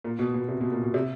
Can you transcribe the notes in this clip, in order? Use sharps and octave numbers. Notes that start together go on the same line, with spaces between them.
A#2
B2
B2
C3
B2
A#2
B2
C3